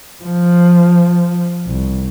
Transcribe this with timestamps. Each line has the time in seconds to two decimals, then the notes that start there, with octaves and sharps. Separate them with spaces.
0.24 F3
1.66 C2